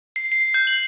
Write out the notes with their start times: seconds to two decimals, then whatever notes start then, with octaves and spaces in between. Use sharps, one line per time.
0.16 C7
0.32 C7
0.54 G6
0.67 F#7